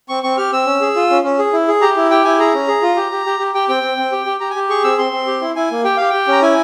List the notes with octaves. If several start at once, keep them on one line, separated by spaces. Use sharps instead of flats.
C4 C#6
C4 C#6
G4 F6
C4 E6
C#4
G#4
F4
C#4
C#4
G#4
E4
G#4
G4 A#5
E4
G4 G5
E4 G#5
G#4 A#5
C#4
G#4
F4
G4
G4
G4
G4
G4 G5
C4 G5
C4
C4
G4
G4
G4 A#5
G#5
G4
G#4 C#6
C4 E6
C4 C6
C4
G4
E4
E4 G#5
A#3
G4 G5
G4 F5
G4 G5
C#4 A#5
E4 G#5